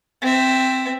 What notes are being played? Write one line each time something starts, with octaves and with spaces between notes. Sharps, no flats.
C4 E5